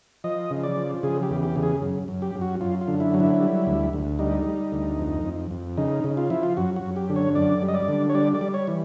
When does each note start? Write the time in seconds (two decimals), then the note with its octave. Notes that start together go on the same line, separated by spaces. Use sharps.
0.24 F3 D#5
0.51 C#3
0.63 D5
0.77 F3
1.03 C#3 G#4
1.23 G4
1.30 E2
1.42 G4
1.56 C#3
1.63 G#4
1.82 F#2
2.08 F#2
2.22 G4
2.35 F#2
2.41 F#4
2.61 F#2 F4
2.81 F4
2.88 D3
3.00 E4
3.14 F#3
3.20 E4
3.41 G3
3.67 D2
3.93 D2
4.19 G3 D#4
4.46 G3
4.72 D2
4.99 F2
5.25 F2
5.51 F2
5.77 C#3 D#4
6.04 C#3
6.17 F4
6.30 F3 E4
6.43 F4
6.57 F#2 F#4
6.76 F#4
6.83 F#2
6.96 G4
7.10 D3
7.16 C#5
7.35 F#2 D5
7.62 G3
7.68 D#5
7.75 D5
7.88 D3
8.09 C#5
8.15 G3 D5
8.34 D5
8.41 G3
8.54 C#5
8.67 E3